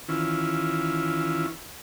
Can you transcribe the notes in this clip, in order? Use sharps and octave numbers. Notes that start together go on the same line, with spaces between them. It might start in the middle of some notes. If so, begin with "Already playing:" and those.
D#3 E3 C#4 E4 F4